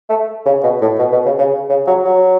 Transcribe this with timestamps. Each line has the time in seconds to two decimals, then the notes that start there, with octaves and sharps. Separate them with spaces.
0.10 A3
0.46 C#3
0.63 B2
0.81 A2
0.99 B2
1.12 B2
1.26 C#3
1.38 C#3
1.70 C#3
1.87 F#3
2.05 F#3